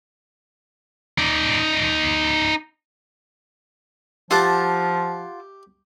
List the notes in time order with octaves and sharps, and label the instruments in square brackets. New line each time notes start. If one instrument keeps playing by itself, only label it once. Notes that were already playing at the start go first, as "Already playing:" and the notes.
[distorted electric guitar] D#4 D5
[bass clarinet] F3 [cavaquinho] F4 F#5 A5 [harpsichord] G4 E5